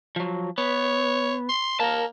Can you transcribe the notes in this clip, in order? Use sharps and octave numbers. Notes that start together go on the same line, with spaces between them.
F3 F#3
B3 C#5
C6
A#3 A#4 A5